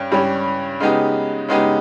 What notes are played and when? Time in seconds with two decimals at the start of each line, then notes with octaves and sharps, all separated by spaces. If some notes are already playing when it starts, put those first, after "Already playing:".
Already playing: G2 C#4
0.12 G2 G3 C#4 G4
0.80 C#3 G#3 B3 D#4 G4
1.49 C#3 G#3 B3 D#4 G4